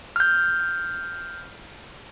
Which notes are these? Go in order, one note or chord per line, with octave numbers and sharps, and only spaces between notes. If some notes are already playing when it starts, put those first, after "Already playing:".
F6 G6